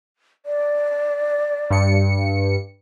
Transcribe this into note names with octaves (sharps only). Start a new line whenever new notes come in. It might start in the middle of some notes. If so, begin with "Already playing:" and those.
D5
G2 C#7